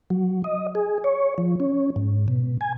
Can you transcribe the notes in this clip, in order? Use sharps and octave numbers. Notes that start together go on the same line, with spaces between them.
F#3
D#5
G#4
C#5
F3
C#4
G#2
B2
G#5